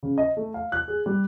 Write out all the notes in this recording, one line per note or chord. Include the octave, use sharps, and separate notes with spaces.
C#3
D#5
A3
F5
F#6
G#4
G3